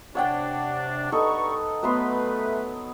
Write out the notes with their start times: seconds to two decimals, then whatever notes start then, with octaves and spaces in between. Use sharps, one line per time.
0.15 C3 D4 C#5 F#5 G5
1.12 G2 D#4 A4 B4 A#5 C#6
1.83 F#3 A3 B3 B4 C6